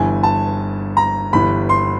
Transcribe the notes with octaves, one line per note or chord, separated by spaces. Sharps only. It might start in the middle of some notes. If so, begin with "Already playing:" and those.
Already playing: G1 G2 E3 G#5
A5
A#5
G1 G2 E3 B5
C6